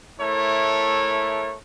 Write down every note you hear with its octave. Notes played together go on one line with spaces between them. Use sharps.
A3 E4 A4 A#4 C#5